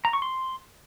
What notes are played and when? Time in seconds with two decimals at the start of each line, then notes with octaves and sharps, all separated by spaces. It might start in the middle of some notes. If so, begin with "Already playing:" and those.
0.05 A#5
0.13 C#6
0.22 C6